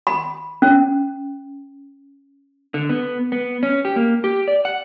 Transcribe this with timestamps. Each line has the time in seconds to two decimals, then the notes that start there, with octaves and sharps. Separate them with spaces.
0.07 B5
0.62 C#4
2.74 D3
2.89 B3
3.32 B3
3.63 C#4
3.85 G4
3.96 A#3
4.24 G4
4.48 D5
4.65 F#5